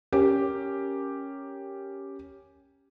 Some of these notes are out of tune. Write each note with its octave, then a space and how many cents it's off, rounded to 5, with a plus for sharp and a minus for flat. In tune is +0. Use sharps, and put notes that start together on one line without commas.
C#4 +0 G4 +0 A#4 +0